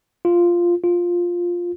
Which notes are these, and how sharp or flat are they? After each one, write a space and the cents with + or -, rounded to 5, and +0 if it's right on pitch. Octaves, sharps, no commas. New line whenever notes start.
F4 -5
F4 +5